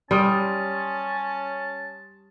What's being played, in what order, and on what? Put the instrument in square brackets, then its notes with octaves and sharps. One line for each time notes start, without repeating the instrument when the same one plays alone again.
[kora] G3 [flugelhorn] C#4 [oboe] A5 [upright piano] C6 D#6 F6